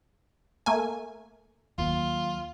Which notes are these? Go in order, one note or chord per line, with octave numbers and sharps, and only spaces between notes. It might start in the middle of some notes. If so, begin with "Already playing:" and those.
A3 A#3 G#5
D#2 F#3 F4